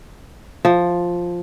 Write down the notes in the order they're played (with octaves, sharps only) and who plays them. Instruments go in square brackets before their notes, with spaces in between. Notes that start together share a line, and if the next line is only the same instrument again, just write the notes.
[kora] F3